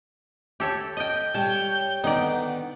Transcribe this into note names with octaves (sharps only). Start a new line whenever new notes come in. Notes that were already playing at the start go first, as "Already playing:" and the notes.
G4 A4 C#5
D#5 G5 G6
G3 C#5 G5 A5
D3 D#3 B3 D#4 D5